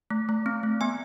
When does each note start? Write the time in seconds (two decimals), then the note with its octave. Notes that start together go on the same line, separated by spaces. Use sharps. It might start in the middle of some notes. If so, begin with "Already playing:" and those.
0.10 A3
0.29 A3
0.46 C4
0.63 A3
0.81 B3 G#5